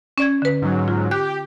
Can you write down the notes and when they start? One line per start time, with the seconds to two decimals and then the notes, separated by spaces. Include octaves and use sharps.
0.18 C#4 D5 G#6
0.42 D3 B4
0.62 G#2 F#3
0.88 F4
1.11 G4 F#6